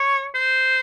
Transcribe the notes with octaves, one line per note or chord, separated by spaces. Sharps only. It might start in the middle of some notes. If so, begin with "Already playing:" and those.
Already playing: C#5
C5